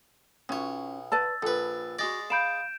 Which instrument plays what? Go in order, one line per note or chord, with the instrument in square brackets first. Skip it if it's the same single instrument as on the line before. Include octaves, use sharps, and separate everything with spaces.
[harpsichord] B1 C#5 [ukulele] C#4 F4
[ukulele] B4 D5 A5 [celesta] E6 A6
[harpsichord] A#1 B4 [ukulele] A4
[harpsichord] G#3 D5 [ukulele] F#4 D#5 [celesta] A#6
[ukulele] F5 B5 [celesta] G6 D7 E7